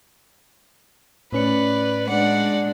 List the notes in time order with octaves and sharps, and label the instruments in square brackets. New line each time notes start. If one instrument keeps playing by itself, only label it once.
[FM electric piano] A2 C#4 C#7 [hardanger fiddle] B4 D5
[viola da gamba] G#3 D4 [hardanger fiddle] D5 F#5